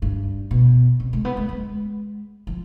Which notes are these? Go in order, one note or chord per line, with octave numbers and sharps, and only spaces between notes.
G2
B2
C3
G#3
B3
G#3
G#3
F3